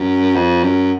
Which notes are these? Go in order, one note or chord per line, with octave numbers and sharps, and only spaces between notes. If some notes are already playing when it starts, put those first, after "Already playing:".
Already playing: F#2
F2
F#2